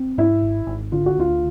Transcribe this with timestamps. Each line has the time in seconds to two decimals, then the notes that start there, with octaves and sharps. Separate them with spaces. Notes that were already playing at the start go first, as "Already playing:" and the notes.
Already playing: C4
0.18 G#2 E4
0.43 G#1
0.67 G#1
0.92 D3 F4
1.06 F#4
1.17 D2 F4